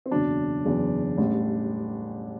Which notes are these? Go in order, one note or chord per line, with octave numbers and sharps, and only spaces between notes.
C4
F#1 E2 B2 F#3 D4
F#1 E2 B2 F#3
A1 A2 G3